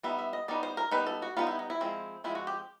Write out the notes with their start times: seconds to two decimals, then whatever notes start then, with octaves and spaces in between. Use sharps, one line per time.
0.03 G3 B3 D#4 E5
0.19 E5
0.33 D#5
0.48 G3 B3 D#4 D5
0.63 C5
0.77 A#4
0.91 G3 B3 D#4 B4
1.06 A4
1.22 F#4
1.37 G3 B3 D#4 F4
1.47 E4
1.59 D#4
1.70 E4
1.80 F3 G#3 C4
2.24 F3 G#3 C4 E4
2.35 F#4
2.47 G4